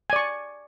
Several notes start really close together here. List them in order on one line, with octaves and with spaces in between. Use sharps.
G#5 D5 C#6